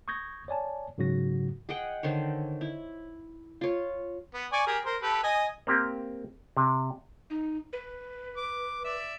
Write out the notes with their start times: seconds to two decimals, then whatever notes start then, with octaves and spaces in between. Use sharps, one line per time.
0.08 C#6 D#6 G6 G#6 A#6
0.48 C#5 D5 G#5 A5
0.98 G#2 C#3 F#3 F#4 A#6
1.69 G#4 D#5 F#5 G5
2.03 D3 D#3 C5 C#5
2.61 E4
3.61 F4 C#5
4.34 B3
4.53 D5 G#5 C#6
4.67 G4 G#4 A#4
4.85 A#4 C5
5.02 G4 A4 B4
5.24 D#5 G#5
5.67 A#3 C4 G4
6.57 C3
7.30 D#4
7.73 B4
8.37 D6
8.84 D5 E5